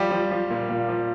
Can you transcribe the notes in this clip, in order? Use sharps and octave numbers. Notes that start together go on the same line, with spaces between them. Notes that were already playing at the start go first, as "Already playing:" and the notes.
Already playing: F3 G3 G4
F3
F3
A#2
A#2
F3